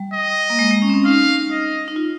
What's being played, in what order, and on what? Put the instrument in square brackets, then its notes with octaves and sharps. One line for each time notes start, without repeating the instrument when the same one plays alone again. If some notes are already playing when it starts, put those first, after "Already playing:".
Already playing: [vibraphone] G3
[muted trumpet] D#5
[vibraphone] A#3
G#3
G#3
C#4
C4
C#4
[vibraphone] D#4 [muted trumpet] F5
[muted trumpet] D#5
[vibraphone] D#4
F4